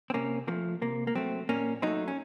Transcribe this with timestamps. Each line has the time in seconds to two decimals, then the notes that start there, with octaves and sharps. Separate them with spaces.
0.10 C4
0.14 C3 A#3 C#4
0.48 F3 A#3
0.51 A3
0.82 C3 A#3
1.07 A#3
1.15 F#3 A3 C4
1.49 A#2 A#3 C#4
1.82 F#3 A3 C4 D#4
2.08 C#4